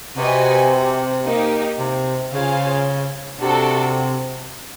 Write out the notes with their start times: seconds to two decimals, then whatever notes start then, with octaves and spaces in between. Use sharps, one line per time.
0.17 C3 F#4 B4 D#5 G#5
1.24 A#3 D#4 G4
1.78 C3
2.32 C#3 F4 G#4 C5 F5
3.40 C3 D4 F#4 A4